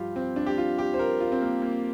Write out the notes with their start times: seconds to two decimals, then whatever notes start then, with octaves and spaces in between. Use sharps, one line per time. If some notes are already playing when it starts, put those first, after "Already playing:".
Already playing: G2 F3 F4 G4
0.16 C4
0.36 D4
0.46 G4
0.58 F4
0.78 G4
0.94 C5
0.99 A#4
1.20 F4
1.32 C4
1.42 A#3
1.62 A#3